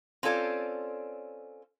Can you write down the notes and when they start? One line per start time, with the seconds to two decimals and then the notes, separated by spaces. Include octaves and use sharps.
0.23 C4 C#4 F4 A4 D5